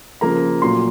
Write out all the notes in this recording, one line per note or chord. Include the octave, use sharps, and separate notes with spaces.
C#3 F3 A#3 A#5
A#2 F#3 A3 C6